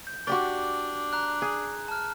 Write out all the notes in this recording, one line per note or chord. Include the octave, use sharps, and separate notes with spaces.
G6
D4 F#4 G4 D5
A#5 F#6
G#4
A5 F6